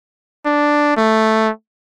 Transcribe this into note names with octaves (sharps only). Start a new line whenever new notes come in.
D4
A3